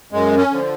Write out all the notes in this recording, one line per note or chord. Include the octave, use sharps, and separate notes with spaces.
F#2 G#3
C#4
D3 F3